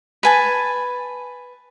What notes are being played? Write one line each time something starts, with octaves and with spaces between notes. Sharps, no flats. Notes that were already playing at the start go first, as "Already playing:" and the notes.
B4 G#5 A5